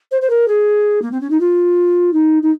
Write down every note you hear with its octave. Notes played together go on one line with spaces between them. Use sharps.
C5
C5
A#4
G#4
A#3
C4
C#4
D#4
F4
D#4
D#4